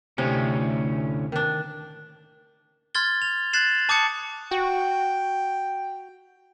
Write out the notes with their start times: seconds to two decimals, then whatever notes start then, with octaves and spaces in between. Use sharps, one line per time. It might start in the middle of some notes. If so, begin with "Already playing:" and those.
0.18 D2 A2 C3 C#4
1.32 D#3 D4
2.95 C6 F6 G#6 A6 G7
3.22 F7
3.53 F#6 G#6 A6 C7 E7 F#7
3.89 A5 D6 D#6 G6 C#7
4.51 F#4 G5